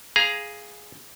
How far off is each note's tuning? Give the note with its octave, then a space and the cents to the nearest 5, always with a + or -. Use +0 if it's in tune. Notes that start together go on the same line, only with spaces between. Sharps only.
G#4 +0 F5 +0 A#5 +15